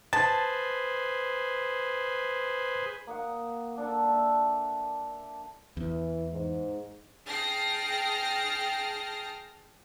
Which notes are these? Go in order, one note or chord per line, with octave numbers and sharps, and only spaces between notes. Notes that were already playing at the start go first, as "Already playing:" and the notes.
G#4 B4 C5 A5 A6
A#3 D#5 F#5
A#3 D4 A4
E5 A5
E2 E3
G#2
G#4 G5 A5 F6 A#6 C7